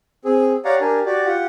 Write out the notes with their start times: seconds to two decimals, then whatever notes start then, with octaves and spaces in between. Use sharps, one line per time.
0.25 C4 G#4
0.65 G4 C#5 D5 F5 F#5 A#5
0.81 D4 G4 A#4 G#5
1.06 F#4 G4 D5
1.26 F4 G4 F#5